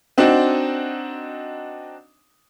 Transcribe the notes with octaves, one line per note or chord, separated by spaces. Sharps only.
C4 D4 D#4 F#4